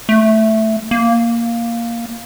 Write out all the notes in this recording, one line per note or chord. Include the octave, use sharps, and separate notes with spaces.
A3
A#3